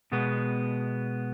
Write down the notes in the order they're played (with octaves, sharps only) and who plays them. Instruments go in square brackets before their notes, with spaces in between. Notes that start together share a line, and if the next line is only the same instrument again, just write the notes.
[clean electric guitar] B2 G#3 B3